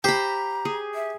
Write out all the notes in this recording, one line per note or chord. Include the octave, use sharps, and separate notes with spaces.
G4 C5 A#5 B5
G#4
E5